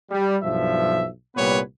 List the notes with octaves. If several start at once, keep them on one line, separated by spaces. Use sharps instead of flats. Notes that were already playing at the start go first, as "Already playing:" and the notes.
G3
B1 G2 F3 E5
C2 A#2 G3 B3 B4 C#5